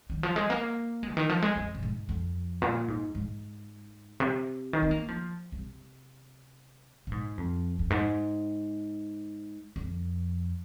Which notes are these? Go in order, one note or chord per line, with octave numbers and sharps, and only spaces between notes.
D#3
F3
G#3
A#3
G#3
C3
D#3
F3
G#3
F2
A#2
G#2
F2
A#2
G#2
G#2
C3
D#3
C4
A#3
F3
C3
A#2
G#2
F2
F2
G#2
F2